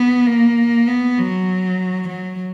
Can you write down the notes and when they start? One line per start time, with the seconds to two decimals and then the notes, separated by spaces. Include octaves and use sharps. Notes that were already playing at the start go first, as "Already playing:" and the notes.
Already playing: B3
0.27 A#3
0.88 B3
1.18 F#3
2.09 F#3